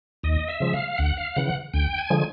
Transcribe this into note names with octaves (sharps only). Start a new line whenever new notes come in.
D#2 D#5
E5
C#3 F3 G#3
F5
D2 F#5
F5
C#3 E3 F#5
D2 G5
G#5
D3 F3 G#3